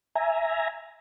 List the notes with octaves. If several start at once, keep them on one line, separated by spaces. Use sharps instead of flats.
E5 G#5 A#5